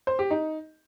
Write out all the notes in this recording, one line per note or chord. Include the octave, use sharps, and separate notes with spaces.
C5
G4
D#4